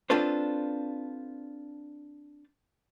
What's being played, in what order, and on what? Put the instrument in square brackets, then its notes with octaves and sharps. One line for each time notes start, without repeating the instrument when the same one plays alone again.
[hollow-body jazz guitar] C4 D4 F4 A4 B4 C5